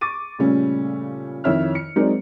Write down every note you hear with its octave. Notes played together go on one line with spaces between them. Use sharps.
C#6 D6 A6 D#7
A#2 C#3 G3 A3 C#4
F2 D#3 E4 C#5 E5 F6
C#7
F#3 G#3 C4 D#4 A#4 D5